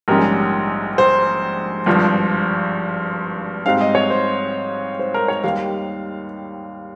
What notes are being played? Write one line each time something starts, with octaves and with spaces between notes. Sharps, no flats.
A#1 G#2 G3 C#4 A#4
C5
G#1 G2 F3
G#2 G3 C4 D#4 F5
D#5
C#5
C5
C5
A#4
C#5
D#2 D#3 G3 F5